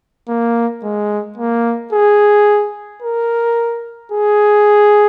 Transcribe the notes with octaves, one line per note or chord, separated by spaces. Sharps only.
A#3
G#3
A#3
G#4
A#4
G#4